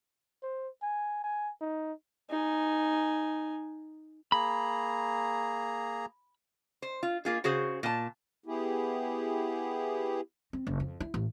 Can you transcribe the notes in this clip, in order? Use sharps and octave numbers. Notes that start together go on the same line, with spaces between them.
C5
G#5
G#5
D#4
D#4 G#5
A#3 G#4 A#5 B5
C5
F4
A#3 F4 G#4
C#3 F#4 G#4 C5
A#2 A5
B3 E4 G4 G#4
C4
F#1
F2
E4
A1